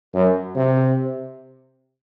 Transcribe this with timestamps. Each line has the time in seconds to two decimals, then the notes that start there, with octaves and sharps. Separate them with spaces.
0.15 F#2
0.56 C3